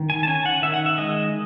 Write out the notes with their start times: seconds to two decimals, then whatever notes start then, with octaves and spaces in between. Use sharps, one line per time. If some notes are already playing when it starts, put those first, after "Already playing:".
Already playing: D#3
0.10 G#5
0.23 A5
0.27 C#4 G#5
0.46 F#5
0.62 D#3 E5
0.74 F#5
0.86 E5
0.98 G#3 D#5